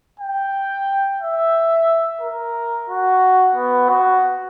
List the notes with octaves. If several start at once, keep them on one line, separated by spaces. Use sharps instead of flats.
G5
E5
A#4
F#4
B3
F#4